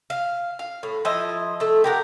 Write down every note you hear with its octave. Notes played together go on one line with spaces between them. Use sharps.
F5
F5
A2
F3 E4 D#5
A3 A4
G4 A#4 F#5